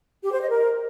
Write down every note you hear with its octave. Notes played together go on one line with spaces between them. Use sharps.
G4
C5
D#5
A#4